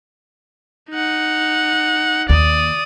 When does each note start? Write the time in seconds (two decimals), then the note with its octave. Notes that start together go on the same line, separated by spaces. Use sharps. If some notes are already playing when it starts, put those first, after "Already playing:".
0.90 D#4 F#5
2.29 D#2 D5 D#6